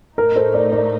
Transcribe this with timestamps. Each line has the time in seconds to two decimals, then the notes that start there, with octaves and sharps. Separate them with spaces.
0.18 A2 A3 D#4 A#4
0.36 A4 C5
0.54 A#4 D5
0.72 A#4 D5